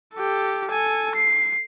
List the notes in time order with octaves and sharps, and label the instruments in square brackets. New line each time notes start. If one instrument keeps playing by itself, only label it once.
[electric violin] G4 A4
A4 G#5
C7